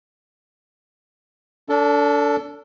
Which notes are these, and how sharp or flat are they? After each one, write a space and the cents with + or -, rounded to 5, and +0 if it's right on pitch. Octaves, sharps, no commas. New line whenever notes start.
D4 -30 A4 +20